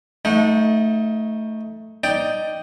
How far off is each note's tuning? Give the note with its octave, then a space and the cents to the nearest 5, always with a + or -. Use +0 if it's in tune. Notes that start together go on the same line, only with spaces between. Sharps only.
A3 +0 D#4 +20 F#5 -30
D#4 +0 D5 +0 G5 +0